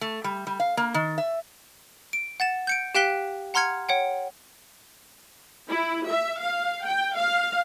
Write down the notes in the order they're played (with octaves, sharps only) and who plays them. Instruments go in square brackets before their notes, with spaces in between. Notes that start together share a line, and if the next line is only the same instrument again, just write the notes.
[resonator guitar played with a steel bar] A3
G3
G3
F5
A#3
D#3
E5
[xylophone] D7
F#5 A6 E7
G6 C#7 D7
G4 F5 G5 F#6 B6 G7
F#5 A#5 C6 F6 G#6 C#7
C#5 F#5 G5
[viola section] E4
E5
F5
G5
F5